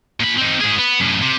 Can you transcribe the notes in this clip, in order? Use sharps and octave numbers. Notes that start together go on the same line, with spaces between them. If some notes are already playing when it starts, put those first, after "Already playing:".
A#2 B5
C4 D#4
G#2 G#4
B3
F#2 A2
C3